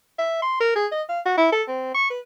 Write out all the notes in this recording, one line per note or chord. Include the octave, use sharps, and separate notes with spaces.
E5
C6
A#4
G#4
D#5
F5
F#4
E4
A4
C4
C#6
B4